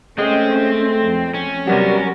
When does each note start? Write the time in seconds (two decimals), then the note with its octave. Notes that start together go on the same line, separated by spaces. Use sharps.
0.18 G#3 A3 C4 C#4
1.01 F2
1.34 C#4
1.67 C3 F#3 G3 B3 F#4 A#4